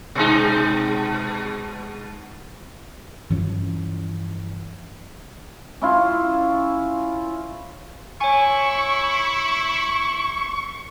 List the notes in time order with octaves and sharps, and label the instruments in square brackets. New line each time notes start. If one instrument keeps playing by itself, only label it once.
[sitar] B2 G#3 D#4
[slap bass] G2 E3 F3 C#4
[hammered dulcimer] C#4 E4 F4
[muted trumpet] E4 [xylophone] C#5 G#5 [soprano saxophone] C#6